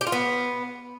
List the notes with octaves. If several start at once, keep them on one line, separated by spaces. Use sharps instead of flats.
G4
F4
B3